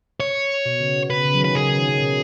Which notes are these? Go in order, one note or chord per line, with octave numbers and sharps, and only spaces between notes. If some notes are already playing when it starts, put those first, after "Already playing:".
C#5
B2
C#3
C#3 B4
C#3
F#3
D#3
B4
C#3 G#4
C#3
D#3
C#3
B2